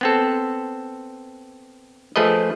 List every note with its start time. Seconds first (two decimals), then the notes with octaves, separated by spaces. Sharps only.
0.01 B3 C4 A4
2.16 F3 A3 G#4 B4 D#5